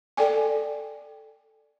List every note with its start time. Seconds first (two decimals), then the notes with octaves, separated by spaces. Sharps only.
0.17 A4 D5 G5 G#5